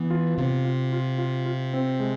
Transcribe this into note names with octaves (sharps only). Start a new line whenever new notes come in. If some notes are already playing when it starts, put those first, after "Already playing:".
Already playing: E3 B3
F4
C3 F4
F4
F4
F4
F4
C4
G#3